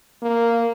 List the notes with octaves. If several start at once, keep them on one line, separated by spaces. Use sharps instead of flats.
A#3